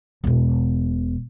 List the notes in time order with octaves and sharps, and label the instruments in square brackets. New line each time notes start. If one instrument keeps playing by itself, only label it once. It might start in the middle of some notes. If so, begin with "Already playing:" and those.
[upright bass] E1 B2